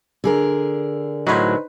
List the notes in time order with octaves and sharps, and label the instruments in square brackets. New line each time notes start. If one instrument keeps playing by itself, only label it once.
[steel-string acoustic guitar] D3 G#4 A#4
[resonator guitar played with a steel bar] A2 F#3 [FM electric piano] D#4 B4 C5